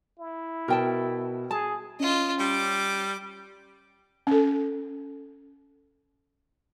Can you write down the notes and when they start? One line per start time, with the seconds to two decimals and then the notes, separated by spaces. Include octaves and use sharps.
0.19 E4
0.68 B2 A#4 G5 A5
1.51 G#4 A5
2.00 C#4 F4 D#5
2.40 G3 D6
4.27 C#4 A4